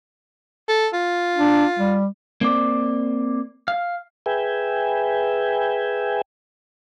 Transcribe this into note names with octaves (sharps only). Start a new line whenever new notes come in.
A4
F4
D4
G3
A#3 C4 D5
F5
G#4 B4 E5 G5 G#5